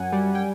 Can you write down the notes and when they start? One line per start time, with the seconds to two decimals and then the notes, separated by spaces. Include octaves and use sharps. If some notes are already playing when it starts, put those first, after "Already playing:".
Already playing: F#2 F#5 G#5
0.12 G3
0.35 G5